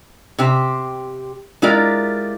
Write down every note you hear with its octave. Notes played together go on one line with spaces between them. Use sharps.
C3 G4 C5
G#3 E4 F4 G4 A#4 D5